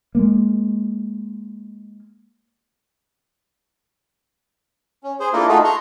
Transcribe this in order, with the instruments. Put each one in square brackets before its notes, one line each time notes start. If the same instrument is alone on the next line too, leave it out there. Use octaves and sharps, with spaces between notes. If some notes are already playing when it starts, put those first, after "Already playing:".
[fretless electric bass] G#3 A#3
[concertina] C#4
G#4 C5
A#3 D4 E4 F4 A4 A#4
A3 D#4 F4 F#4 G#4 A4
A#5 C6 C#6